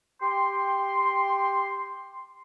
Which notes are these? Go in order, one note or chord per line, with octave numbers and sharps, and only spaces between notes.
G4 G5 C6